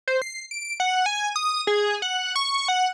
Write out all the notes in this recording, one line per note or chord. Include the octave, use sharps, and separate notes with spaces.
C5
C7
D7
F#5
G#5
D#6
G#4
F#5
C#6
F#5